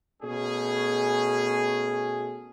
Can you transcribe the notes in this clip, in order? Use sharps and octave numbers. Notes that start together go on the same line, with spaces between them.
B2 A3 C#4 G#4